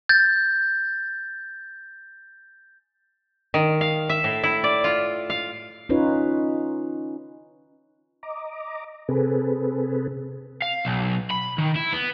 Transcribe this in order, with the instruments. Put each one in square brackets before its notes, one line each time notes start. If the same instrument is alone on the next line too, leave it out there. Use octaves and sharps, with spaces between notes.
[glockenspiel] G6 A6
[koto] D#3
F5
E5
A2
E4
D5
F4
F5
[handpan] C#4 D#4 F4 B4 C#5
[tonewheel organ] D#5 A#5 D6
C3 C4 G#4 A4 B4
[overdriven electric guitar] F5
B1
B5
D#3
E4
B3